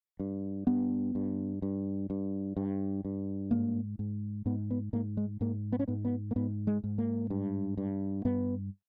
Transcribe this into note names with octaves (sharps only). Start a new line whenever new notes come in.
G2
G2 B3
G2
G2
G2
G2
G2
G#2 A#3
G#2
G#2 B3
B3
G#2 A#3
G#3
G#2 A#3
B3
C#4
G#2 B3
B3
A#3
G#2 B3
G#3
G#2
A#3
G2
G2
G2 B3